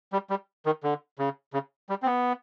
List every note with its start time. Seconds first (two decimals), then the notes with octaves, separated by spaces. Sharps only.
0.13 G3
0.30 G3
0.66 D#3
0.83 D3
1.19 C#3
1.53 C#3
1.89 G3
2.02 C4
2.06 B3